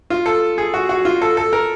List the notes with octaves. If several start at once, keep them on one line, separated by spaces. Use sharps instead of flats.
F4
A4
G#4
F#4
F#4
F4
A4
A4
A#4